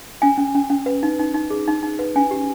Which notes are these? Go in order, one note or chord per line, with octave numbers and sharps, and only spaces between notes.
C#4 G#5
C#4
C#4
C#4
B4
D#4
D#4
D#4
G#4
D#4
D#4
B4
C#4 G#5
G4